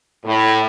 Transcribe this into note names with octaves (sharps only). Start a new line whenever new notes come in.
A2